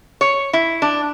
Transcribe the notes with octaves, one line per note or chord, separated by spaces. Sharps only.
C#5
E4
D4